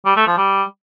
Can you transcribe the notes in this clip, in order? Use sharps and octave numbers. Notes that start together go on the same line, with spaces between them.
G3
A3
F3
G3